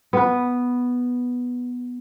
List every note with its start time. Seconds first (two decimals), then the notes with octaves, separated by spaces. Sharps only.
0.13 B3 B4